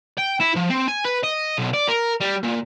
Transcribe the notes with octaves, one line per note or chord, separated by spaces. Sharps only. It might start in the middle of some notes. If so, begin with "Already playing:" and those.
G5
E4
F3
C4
G#5
B4
D#5
B1
D5
A#4
G3
A#2